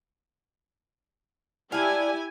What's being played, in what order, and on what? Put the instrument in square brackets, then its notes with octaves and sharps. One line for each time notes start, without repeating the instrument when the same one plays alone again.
[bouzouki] D4 F5 [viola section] E4 G4 G#5